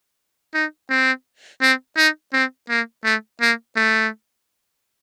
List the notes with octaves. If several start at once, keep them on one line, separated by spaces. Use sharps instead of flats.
D#4
C4
C4
D#4
C4
A#3
A3
A#3
A3